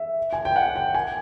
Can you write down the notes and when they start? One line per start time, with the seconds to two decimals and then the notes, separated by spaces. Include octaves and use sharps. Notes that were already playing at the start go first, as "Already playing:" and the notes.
Already playing: E5
0.33 G#5
0.45 G5
0.56 F#5
0.76 G5
0.95 G#5